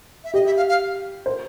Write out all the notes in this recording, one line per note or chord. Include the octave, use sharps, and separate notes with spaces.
E5
G4 D#5
E5
F5
F5
C5